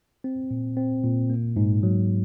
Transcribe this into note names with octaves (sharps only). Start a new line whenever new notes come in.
C4
A#2
C4
A#2
A#3
G#2
F#3